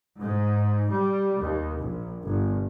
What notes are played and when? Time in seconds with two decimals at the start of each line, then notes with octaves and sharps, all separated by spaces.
0.19 G#2
0.90 G3
1.41 D#2
1.80 A#1
2.22 G1